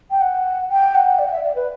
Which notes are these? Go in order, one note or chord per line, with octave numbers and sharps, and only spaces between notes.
G5
F#5
G5
F#5
D5
F#5
E5
D5
B4